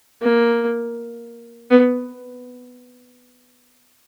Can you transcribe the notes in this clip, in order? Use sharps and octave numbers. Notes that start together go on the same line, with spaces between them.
A#3
B3